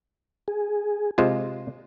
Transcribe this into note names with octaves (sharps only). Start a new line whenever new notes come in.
G#4
C3 G#3 F4 C5